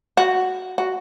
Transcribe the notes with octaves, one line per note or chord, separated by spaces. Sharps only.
F#4
F#4